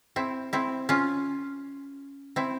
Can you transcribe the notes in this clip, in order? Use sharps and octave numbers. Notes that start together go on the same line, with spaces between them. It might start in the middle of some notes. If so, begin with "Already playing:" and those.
C4 E4
C4 E4
C#4 F4
C4 E4